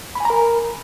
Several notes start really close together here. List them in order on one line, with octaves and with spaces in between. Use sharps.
B5 G#5 A#5 A#4